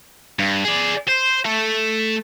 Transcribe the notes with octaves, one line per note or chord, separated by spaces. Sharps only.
G2
G#4 D5
C5
A3 A4